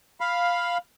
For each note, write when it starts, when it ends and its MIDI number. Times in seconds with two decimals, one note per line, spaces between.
0.21 0.78 77
0.21 0.78 83